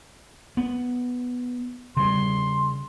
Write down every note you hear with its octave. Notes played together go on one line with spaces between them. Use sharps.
B3
C#3 G3 C6